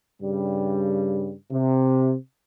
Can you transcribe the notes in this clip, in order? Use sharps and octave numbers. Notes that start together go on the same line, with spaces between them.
G2 C#3 G3
C3